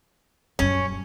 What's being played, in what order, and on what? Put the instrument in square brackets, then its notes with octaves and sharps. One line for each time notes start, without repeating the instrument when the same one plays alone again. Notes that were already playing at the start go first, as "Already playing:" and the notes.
[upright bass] D#1 F#2 [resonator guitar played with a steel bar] C#4